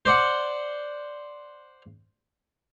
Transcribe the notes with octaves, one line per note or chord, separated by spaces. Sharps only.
C5 D5 F#5